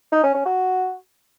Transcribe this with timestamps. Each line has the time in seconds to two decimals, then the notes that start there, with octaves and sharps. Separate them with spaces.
0.12 D#4
0.23 C#4
0.34 C#4
0.46 F#4